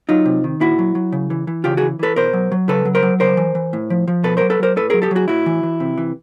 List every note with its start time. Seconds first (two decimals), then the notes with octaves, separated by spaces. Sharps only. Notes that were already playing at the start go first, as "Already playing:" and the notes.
0.09 F#3 D#4 F4
0.26 C3
0.44 D#3
0.61 A#2 E4 F#4
0.79 F#3
0.95 F#3
1.12 C#3
1.30 E3
1.47 E3
1.64 C#3 F4 G4
1.77 E3 F#4 G#4
1.99 E3 A4 B4
2.16 B2 A#4 C5
2.33 F#3
2.52 F#3
2.68 C#3 A4 B4
2.85 F#3
2.95 A#4 C5
3.03 F#3
3.20 C#3 A#4 C5
3.37 E3
3.55 E3
3.73 A2
3.90 F3
4.08 F3
4.24 B2 A4 B4
4.37 F#3 A#4 C5
4.50 A4 B4
4.60 F#3 A#4 C5
4.76 A2 A4 B4
4.90 F#3 G#4 A#4
5.02 G4 A4
5.11 F#3 F#4 G#4
5.28 A2 E4 F#4
5.46 E3
5.63 E3
5.80 C3
5.98 E3